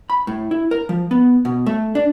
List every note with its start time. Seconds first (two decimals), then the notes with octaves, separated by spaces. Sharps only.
0.10 B5
0.27 A2
0.51 E4
0.71 A#4
0.89 F3
1.11 B3
1.45 B2
1.66 A3
1.95 D4